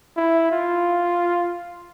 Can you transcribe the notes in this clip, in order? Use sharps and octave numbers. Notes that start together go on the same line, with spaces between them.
E4
F4